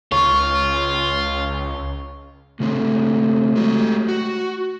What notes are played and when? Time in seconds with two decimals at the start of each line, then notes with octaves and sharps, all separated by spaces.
0.12 C#2 F4 C#5
2.60 C#3 E3 A3 C4
3.56 G#3 F#4 G4
4.09 F#4